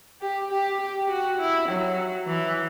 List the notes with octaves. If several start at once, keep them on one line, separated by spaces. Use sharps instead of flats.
G4
G4
G4
F#4
E4
F#3
E3